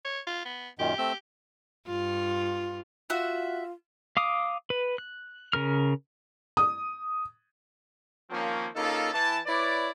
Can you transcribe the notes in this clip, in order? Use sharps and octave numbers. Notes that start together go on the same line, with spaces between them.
C#5
F4
B3
F#2 A#2 D#3 G4
A3 C4 E6
G2 F4
F4 F#4 E5
F5 D6 D#6
B4
F#6
C#3 A#4 F6
D#6
D#3 F3 A#3 C4 C#4
C#3 A#3 D#4 F4 A4
E3 A5
E4 B4 C#5 D5